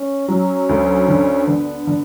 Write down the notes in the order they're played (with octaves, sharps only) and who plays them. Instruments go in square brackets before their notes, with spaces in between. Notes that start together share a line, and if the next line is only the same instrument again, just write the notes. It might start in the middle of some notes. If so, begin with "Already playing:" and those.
Already playing: [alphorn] C#4
[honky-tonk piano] F#3 [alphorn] C#4
[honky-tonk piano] D2
D3
[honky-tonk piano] D3 [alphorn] B3
[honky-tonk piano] D3